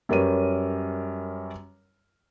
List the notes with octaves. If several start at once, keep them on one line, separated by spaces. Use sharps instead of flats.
F#2 G3 A#4 B4 C#5 D#7